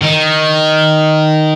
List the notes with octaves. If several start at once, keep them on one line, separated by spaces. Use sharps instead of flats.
D#3